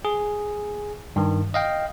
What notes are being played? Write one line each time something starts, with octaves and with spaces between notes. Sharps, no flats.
G#4
G2 D#3
D#5 F5 G5